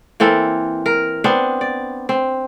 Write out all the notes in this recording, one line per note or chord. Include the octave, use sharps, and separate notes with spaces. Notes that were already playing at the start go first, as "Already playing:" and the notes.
E3 A#3 C4 A4
A#4
B3 C4 D4
D5
C4